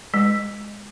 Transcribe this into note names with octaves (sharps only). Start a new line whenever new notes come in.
G#3